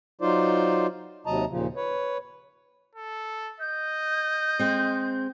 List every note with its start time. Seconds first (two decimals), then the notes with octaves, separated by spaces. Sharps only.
0.21 F#3 D#4 F4 C5 D5
1.26 D#2 C3 F#3 D#5 A5 A#5
1.50 D#2 A#2 C#3 F3
1.76 B4 C#5
2.95 A4
3.60 D#5 G6
4.59 G#3 C4